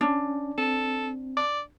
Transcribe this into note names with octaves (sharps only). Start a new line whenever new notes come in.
C#4 D4
C4 A4
D5